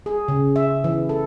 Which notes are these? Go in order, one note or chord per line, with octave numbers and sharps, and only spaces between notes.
G#4
C#3
E5
E3
A4